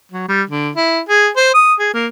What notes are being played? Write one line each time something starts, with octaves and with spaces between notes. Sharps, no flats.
F#3
G3
D3
E4
G#4
C5
D#6
G#4
A#3